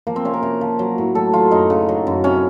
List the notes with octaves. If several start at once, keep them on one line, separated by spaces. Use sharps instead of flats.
F3 A#3
C4
C3 C#4
A#4
C3
F3
F#3
A2
F#3 A4
F#3 F4
F#2 D#4
C#3
F#3
F#2
C3 C#4